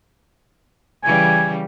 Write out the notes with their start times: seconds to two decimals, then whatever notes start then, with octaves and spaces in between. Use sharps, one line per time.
1.04 C#3 E3 G3 G#5